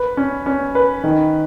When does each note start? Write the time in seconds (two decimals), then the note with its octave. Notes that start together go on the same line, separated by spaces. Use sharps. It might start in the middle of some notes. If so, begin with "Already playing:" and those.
Already playing: B4
0.17 C#4
0.46 C#4
0.75 B4
1.04 D#3